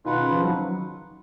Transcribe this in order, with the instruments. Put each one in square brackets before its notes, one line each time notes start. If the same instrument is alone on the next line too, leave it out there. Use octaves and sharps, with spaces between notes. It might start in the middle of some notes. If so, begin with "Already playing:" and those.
[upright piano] B2 D#3 [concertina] F4 B4 F#5
[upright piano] C#3
C#3 F3
D#3 F#3